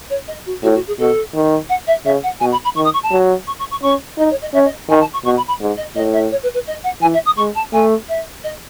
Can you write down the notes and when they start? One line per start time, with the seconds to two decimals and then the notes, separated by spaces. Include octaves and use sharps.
0.10 C#5
0.28 D#5
0.46 F#4
0.63 A2 F#4
0.75 F#4
0.87 G#4
0.99 B2 A4
1.34 D#3
1.69 F#5
1.87 E5
2.05 C#3 E5
2.23 F#5
2.40 B2 G#5
2.52 B5
2.64 B5
2.76 D#3 C#6
2.84 D#6
2.94 C#6
3.03 A5
3.11 F#3
3.47 C#6
3.59 C#6
3.71 C#6
3.82 C#4 C#6
4.18 D#4 D#5
4.30 C#5
4.42 D#5
4.54 C#4 E5
4.65 D#5
4.89 D#3 G#5
5.00 A5
5.13 C#6
5.24 B2 C#6
5.37 B5
5.48 B5
5.60 G#2
5.77 D#5
5.95 A2 D#5
6.13 E5
6.31 C#5
6.43 B4
6.54 B4
6.67 D#5
6.84 F#5
7.02 E3 G#5
7.14 E5
7.25 D#6
7.37 G#3 C#6
7.55 A5
7.73 A3 G#5
8.09 E5
8.44 D#5